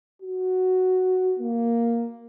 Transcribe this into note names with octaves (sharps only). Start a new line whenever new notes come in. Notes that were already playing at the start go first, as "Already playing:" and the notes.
F#4
A#3